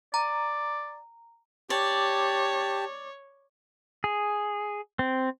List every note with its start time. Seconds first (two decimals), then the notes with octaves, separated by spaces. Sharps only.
0.14 D5 A#5
1.70 G4 C#5 D5 A5
4.04 G#4
4.99 C4